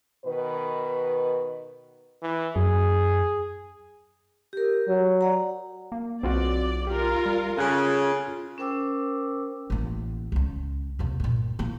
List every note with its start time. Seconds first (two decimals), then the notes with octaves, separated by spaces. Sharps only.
0.25 B2 D#3 B4
2.22 E3
2.56 F#2 G#4
4.53 G4 A#4
4.88 F#3
5.21 D5 F#5 A#5
5.92 A#3
6.23 B1 C4 F4 F#4 D5
6.87 F4 G4 A#4
7.26 G3
7.57 C#3 C#4 F4 A4 F#6 G#6
8.58 C#4 A#4 C5 G5 D6 E6
9.70 A1 A#3
10.32 C#2 C#4
10.99 D#2 C3
11.20 G2 A#2
11.59 A#3 E4